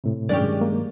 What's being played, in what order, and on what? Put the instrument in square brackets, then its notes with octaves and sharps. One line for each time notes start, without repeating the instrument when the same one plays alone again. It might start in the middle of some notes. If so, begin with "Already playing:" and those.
[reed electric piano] A2 C3
[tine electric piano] G2 D#3 F#3 [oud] G#3 C#4 G4 [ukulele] D5
[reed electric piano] A#3